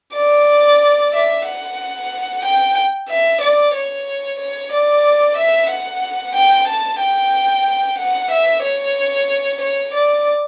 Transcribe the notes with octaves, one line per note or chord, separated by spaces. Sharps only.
D5
E5
F#5
G5
E5
D5
C#5
C#5
D5
E5
F#5
G5
A5
G5
F#5
E5
C#5
C#5
D5